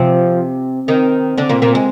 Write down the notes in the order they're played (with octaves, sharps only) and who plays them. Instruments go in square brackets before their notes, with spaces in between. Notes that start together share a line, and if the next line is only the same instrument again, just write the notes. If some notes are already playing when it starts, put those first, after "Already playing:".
Already playing: [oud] C3 C4 [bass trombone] F3
[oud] D#3 D#4 [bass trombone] C4
[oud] D3 D4
A#2 A#3
A#2 A#3
G#3